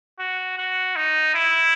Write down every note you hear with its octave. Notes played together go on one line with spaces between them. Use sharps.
F#4
F#4
D#4
E4